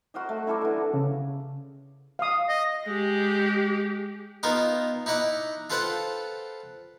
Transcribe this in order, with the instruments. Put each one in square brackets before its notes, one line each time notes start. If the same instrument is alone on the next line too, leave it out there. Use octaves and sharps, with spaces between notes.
[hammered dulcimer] F#4 A#4 C5 D#5
A3
E4 A4 A#4 D5
D3 E3
[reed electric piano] C#3
[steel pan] F5 D#6
[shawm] D#5
[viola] G#3 G4
[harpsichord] B3 D#4 F4 A#4 G5
D#4 E4 D#5 F#5 D6
F4 A4 B4 C5 F#5 G5